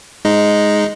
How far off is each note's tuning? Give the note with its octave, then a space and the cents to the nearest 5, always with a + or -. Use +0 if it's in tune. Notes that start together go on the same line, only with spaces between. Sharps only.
G#3 +0 D#4 +0